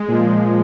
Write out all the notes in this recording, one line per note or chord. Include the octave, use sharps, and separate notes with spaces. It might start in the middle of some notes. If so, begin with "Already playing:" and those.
Already playing: G#3
A#2 F3